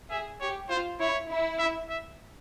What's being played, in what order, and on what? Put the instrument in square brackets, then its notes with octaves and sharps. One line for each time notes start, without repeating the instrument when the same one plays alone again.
[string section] G#4 [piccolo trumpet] E5
[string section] G4 [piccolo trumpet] C#5
[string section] F4 [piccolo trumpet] C5
[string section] E4 [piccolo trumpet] C#5
[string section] E4
[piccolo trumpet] E5
E5